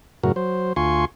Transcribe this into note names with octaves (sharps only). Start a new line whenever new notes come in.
F#2 A2 C#3 F#4 A#4
F#3 C5
D2 F4 G#5 C6 C#6